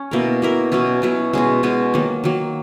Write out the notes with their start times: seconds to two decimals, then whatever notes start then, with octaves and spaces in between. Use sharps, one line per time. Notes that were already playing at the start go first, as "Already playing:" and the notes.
Already playing: C#4
0.11 B2 A#3 E4 A#4
0.42 B2 A#3 E4 A#4
0.72 B2 F#3 C#4 E4
1.02 B2 F#3 C#4 E4
1.33 B2 G#3 C#4 F#4
1.63 B2 G#3 C#4 F#4
1.94 D#3 F#3 A#3
2.24 D#3 F#3 A#3